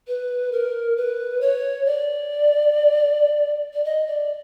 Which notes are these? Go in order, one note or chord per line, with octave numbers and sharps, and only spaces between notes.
B4
A#4
B4
C#5
D5
D5
D#5
D5